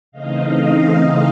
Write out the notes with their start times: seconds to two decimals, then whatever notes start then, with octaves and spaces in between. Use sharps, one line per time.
0.12 C#3 E3 A3 C4 D#4 D#5 F5